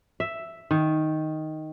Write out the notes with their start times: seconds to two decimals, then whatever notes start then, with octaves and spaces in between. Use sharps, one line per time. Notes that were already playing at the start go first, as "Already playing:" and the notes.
0.20 E5
0.71 D#3